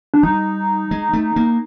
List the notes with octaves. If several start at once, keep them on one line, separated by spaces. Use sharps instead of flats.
D4
G3 D#4
G#3
A3
A#3